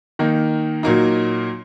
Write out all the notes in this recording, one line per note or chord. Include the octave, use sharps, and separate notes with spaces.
D#3 A#3 D#4
A#2 F#3 A#3 D#4